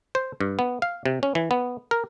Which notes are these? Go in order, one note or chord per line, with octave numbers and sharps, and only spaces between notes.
C5
G2
B3
F5
C3
C#4
E3
B3
A#4